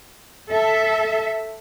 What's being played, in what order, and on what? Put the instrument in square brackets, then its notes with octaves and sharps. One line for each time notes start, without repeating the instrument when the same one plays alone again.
[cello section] A4 E5